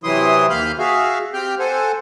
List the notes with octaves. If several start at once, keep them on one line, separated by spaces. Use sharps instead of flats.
C3 E3 F#3 E4 C6 D#6
D#2 A#3 F5 B5 F6 G6
F#4 G#4 E5 F5
C4 G4 G5 F6 G6
A4 C5 F#5 G#5